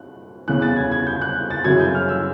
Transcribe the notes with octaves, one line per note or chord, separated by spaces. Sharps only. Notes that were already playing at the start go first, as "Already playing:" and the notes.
Already playing: F#6
E2 C#3 E3 F#6
A6
G#6
G#6
G6
F#6
A6
F#2 C#3 E3 G#6
G6
F6
E6